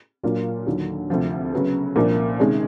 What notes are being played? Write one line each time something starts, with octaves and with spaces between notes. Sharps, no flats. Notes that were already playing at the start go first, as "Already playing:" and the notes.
A#2 F#3 A#3 D4 F4
D#2 D3 F#3
D2 C3 F3
C#3 F#3 B3
C2 A#2 F3 A#3 D4
C3 D#3 G#3 C#4